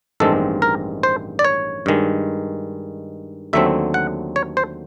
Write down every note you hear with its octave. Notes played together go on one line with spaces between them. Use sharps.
A1 G2 D#3 G#3 C4 A4
A#4
C5
D5
C#5
G2 D#3 G#3
D#2 D3 F#3 A3 C4 E5
F#5
C#5
C5